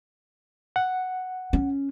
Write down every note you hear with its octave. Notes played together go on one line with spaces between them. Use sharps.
F#5
C#4